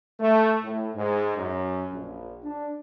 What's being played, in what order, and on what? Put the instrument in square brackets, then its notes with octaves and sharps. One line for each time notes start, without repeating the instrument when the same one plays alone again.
[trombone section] A3
A2
G#2
F#2
A#1
D4